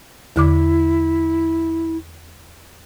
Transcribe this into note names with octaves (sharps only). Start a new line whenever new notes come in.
E2 D3 E4 D6